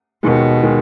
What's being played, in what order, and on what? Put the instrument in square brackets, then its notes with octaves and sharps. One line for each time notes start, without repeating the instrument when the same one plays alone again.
[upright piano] D#2 D#3 G#3 [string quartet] B2
[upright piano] D#3 G#3